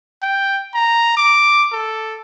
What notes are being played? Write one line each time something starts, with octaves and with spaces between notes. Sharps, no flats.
G5
A#5
D6
A4